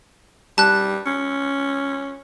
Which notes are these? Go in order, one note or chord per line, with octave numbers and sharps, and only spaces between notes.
G3 A5 F#6
C#4